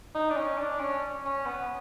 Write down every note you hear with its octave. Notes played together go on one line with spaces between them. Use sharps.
D#4
D4
C#4
D4
C#4
C#4
B3